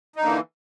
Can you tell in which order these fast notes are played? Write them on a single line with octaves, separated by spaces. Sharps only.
D#4 D3 A#3 E3